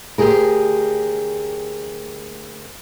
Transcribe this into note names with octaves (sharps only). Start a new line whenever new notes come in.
D2 G4 G#4 A#4